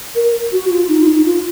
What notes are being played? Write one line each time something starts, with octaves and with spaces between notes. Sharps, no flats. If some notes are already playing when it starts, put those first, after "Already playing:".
A#4
F#4
F4
D#4
F4
D#4
F4